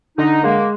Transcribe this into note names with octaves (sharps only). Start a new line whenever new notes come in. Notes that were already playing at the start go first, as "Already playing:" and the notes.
D3 D#4
G#3 A#3